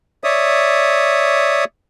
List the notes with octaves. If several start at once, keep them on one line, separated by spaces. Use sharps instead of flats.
C#5 D5 E5 D#6